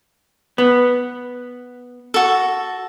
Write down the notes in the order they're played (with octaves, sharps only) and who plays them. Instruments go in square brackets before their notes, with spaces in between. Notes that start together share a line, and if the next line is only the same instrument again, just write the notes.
[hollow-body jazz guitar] B3
[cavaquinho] F#4 A4